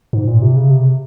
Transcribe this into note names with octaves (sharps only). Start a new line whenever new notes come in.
G#2
A#2
C3
C#3
C3